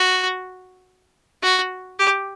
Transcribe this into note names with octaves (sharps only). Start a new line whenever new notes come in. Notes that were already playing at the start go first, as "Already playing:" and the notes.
Already playing: F#4
F#4
G4